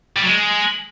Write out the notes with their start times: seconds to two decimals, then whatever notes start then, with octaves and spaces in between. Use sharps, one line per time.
0.16 G3
0.22 F#3
0.27 G#3